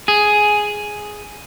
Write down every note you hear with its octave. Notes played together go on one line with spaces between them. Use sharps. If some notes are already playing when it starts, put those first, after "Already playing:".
G#4